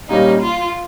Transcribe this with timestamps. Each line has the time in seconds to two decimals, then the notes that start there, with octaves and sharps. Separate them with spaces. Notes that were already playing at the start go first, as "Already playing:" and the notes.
0.09 A#2 G3 A#3 C#4 D#4
0.42 F4